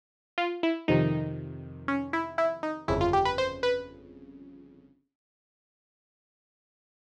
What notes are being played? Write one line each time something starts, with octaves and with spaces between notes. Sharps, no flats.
F4
E4
F2 C3 D#3 D#4
C#4
E4
E4
D#4
G1 F2 C#3 E4
F4
G4
B4
C5
B4